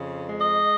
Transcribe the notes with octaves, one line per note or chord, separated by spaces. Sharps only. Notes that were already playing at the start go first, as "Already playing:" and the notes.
Already playing: F2 C#3
G#3
D#5